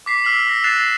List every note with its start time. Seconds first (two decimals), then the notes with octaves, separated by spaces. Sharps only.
0.06 D6 B6 C7
0.24 E6 F6 B6 F#7
0.47 E6 A#6
0.64 E6 F#6 A6 C7 E7 F7